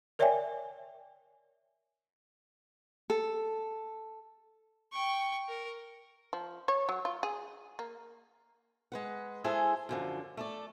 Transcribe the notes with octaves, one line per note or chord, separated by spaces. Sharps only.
A#4 C#5 D5 E5 G5 G#5
A4
G5 C#6
A#4
F3
C#5
F#3
F4
G#4
A#3
G#3 B4 F#5
G#3 E4 G#4 A4 C5 G#5
F#2 D3 F3
A3 A4 D5